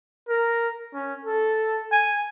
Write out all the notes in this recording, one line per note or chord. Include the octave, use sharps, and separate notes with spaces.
A#4
C#4
A4
G#5